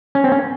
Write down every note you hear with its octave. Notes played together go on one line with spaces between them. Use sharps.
C#4
C4
C#4